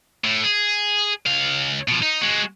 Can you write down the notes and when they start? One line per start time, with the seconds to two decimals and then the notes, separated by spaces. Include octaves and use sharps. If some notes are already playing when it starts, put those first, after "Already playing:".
0.24 A2
0.43 G#4
1.26 C#2 F5
1.88 B2 F3
2.02 D#4
2.21 G#3 F#4